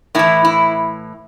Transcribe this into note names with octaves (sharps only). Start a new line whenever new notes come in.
A2 E3 E4
E4